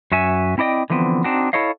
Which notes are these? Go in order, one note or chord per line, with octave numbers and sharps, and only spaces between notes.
F#2 F#4 E5 G#5
C4 E4 D5 D#5 G5
D3 E3 F3 B3 C4
C4 D4 D#4 F#4
E4 A4 C#5 D#5 F5